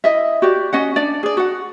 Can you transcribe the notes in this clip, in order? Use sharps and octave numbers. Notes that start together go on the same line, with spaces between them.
E4 D#5 E5
F#4 G4 D5
C#4 D#5 F#5
D4 D5
G#4 D5
F#4 F#5